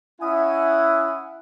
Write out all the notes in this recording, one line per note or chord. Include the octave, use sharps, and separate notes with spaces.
C#4 E4 D#5 E5 F#5 G#5